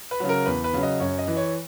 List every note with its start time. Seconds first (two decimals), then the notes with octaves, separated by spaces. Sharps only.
0.11 B4
0.20 C#3 F#3
0.29 A#4
0.46 E2 B4
0.64 B4
0.74 C#3 F#3
0.83 D#5
1.00 F#2 C#5
1.19 D#5
1.28 E3
1.37 C#5